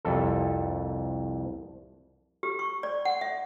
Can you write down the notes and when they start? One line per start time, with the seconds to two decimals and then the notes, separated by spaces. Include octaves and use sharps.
0.05 C2 F2 A4
2.43 G4
2.59 C#6
2.83 D5
3.05 F#5
3.21 E5